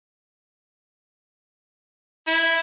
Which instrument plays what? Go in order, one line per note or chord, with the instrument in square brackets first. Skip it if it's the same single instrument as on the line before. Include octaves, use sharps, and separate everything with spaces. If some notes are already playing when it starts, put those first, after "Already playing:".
[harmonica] E4